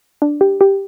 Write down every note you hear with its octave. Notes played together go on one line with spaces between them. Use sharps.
D4
G4
G4